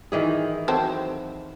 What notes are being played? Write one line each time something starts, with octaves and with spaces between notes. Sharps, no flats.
D#3 E3 G#4
F#3 C4 A4